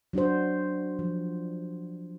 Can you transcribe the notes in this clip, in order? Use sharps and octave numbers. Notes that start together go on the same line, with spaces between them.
F#3 D4 F#4 C5
F3